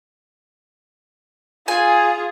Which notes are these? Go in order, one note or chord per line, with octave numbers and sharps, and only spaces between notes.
F4 G#4 G#5